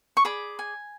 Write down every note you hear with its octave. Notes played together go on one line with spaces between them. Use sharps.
C#6
G#4 D5 B5
G#5